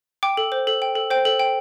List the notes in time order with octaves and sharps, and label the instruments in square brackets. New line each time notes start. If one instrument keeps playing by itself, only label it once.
[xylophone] G5 D6
A4
C5
A4
G5
A4
C5 G5
A4
G5